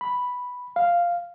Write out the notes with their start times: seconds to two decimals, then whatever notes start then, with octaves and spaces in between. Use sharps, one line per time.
0.01 B5
0.76 F5